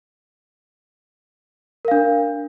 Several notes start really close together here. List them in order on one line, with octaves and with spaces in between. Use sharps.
A#4 F5 D4